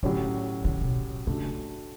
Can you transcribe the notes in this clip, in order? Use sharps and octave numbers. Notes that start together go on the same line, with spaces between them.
A2 D3 F#3 C#4 G4
D3
B2
C#3 A3 D4 F#4